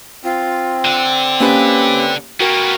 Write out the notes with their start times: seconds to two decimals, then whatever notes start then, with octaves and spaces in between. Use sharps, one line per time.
0.24 C4 F4
0.85 D3
1.40 A#3 C#4 G4 B4
2.40 A#3 B3 F#4 A#4 G5